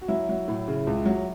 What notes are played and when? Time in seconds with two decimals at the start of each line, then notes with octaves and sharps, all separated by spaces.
0.01 F#4
0.08 F#3 E4
0.29 F#3
0.48 A2
0.68 C#3
0.87 C#2
1.05 F#3